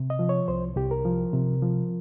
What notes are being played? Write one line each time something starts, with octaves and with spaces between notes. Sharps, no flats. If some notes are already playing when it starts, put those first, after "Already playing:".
Already playing: C3
D#5
F3
C#5
C2 C5
C2 G4
A#4
F3
C3
F3